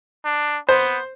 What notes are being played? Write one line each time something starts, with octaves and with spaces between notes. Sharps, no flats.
D4
B3 C5